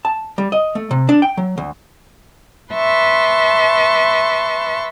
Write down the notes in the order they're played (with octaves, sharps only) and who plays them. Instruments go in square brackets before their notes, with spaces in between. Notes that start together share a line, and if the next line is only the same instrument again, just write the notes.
[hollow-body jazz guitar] A5
G3
D#5
A3
C3
D4
G5
F#3
D2
[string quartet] B4 E5 A5 C6 C#6